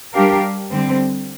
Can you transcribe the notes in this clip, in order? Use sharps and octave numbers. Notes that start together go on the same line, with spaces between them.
G3 D4 G4 A#4 F5
D3 G3 C4